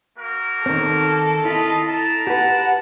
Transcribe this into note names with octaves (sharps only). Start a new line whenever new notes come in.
A#3 F#4 A#4
D#3 C4 A4
E4 F4 D#5 B5
A#4 A5
G4 B4 F#5